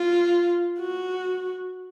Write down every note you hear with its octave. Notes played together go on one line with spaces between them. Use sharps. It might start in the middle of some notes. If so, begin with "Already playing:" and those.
Already playing: F4
F#4